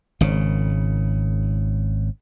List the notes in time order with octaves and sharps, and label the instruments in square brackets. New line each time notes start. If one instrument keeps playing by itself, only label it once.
[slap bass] G#1 C#3